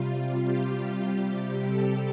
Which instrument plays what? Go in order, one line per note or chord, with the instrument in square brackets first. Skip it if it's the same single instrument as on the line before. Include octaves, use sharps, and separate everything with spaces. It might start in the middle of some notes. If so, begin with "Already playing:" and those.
Already playing: [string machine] C3 G3 F4
G4
C3 G3
A4